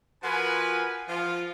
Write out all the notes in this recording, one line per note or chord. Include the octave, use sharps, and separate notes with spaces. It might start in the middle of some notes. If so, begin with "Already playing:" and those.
F3 F4 F#4 A#4 B4 G#5
F3 F4